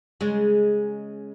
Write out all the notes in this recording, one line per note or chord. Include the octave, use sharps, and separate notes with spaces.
C#3 G#3